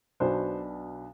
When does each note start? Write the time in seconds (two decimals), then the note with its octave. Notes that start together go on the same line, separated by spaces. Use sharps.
0.20 B1 B2 B3 D4 C5